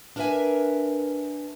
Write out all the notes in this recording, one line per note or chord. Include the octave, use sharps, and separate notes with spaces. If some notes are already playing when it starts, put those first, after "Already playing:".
D4 A#4 B4 D#5 E5 G#5